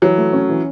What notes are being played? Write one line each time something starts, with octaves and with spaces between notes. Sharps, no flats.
E3 F#3
A3
C#4
E3